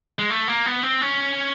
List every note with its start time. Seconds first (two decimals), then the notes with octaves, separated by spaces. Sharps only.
0.19 G#3
0.30 A3
0.48 A#3
0.66 B3
0.83 C4
1.01 C#4